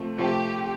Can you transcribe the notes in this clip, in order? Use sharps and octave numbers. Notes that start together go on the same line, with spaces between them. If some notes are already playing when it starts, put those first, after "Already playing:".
Already playing: C3 F3 A3 C4
C3 F3 A3 C4 G4